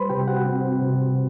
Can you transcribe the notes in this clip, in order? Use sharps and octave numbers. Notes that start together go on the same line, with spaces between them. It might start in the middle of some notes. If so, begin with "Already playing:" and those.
Already playing: G3 B4 C5 B5 C6
C3 G4 G5
F#4 F#5
C4
C3